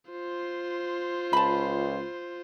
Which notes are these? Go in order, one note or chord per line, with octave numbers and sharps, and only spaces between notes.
F4 C5
C#2 A5 B5